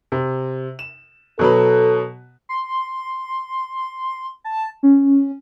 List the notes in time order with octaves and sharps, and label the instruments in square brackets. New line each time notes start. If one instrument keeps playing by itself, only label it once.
[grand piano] C3
E7
[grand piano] B2 F#3 B4 [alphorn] A4
[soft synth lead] C6
A5
C#4